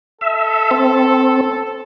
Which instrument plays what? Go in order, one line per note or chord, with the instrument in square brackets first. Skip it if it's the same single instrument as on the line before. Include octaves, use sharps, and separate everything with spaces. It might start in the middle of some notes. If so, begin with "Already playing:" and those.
[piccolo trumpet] A4 [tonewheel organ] E5
[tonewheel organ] C4